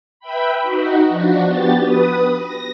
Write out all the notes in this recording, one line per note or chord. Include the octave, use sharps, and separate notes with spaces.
B4 E5 G5 B5
D#4 F#4
F3 D4 F#4
B3 G4 A6
B4 D#6
A#6